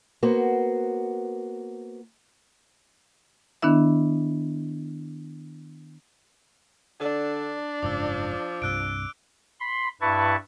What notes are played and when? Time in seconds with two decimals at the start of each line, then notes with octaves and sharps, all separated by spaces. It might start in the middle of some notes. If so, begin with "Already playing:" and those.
0.23 A#3 B3 F#4 C5
3.62 D#3 B3 D4 E4 E5
7.00 D3 D4
7.83 F#1 G#2 C#3 F3 D6 E6
8.62 C2 G2 C3 E6 F#6 D7
9.60 B5 C6
10.01 G2 E4 B4 A5 C#6